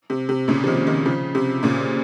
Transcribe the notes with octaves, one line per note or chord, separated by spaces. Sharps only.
C3
C3
A#2 C#3
F3
C3 D#3
C3 D#3
C#3 F3
C3
A#2 C#3